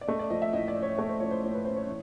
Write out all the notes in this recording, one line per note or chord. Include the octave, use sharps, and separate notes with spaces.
D5
A3 D#5
D5
F3 D#5
E5
A2 D#5
D5
C#4
C#5
A3 C#5
C5
F3 C#5
C5
A2 C#5
B4
C#4 C5
C#5
E3